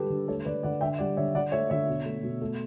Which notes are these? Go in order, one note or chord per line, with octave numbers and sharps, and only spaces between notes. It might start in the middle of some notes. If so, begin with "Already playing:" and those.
Already playing: D3 G3 G4 A4 B4
D3
A3 A4 C#5
D3 B4 D5
D3 D5 F#5
D3 E5 G5
G3 D5 F#5
D3 C#5 E5
D3 D5 F#5
A3 C#5 E5
D3 C#5 E5
B2
A3
B2
A3